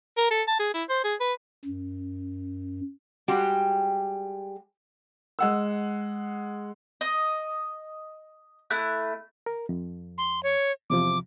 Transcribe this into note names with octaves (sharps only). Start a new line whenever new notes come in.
A#4
A4
A5
G#4
E4
C5
G#4
B4
F#2
G3 G#3 F#4 G4
G#3 F#5 E6
D#5
A3 E4 F#6
A#4
F2
C6
C#5
E2 C3 F3 D6